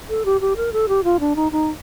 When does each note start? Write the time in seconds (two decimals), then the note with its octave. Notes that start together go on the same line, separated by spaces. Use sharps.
0.09 A4
0.25 G4
0.41 G4
0.57 A#4
0.73 A4
0.89 G4
1.04 F4
1.20 D4
1.36 D#4
1.52 D#4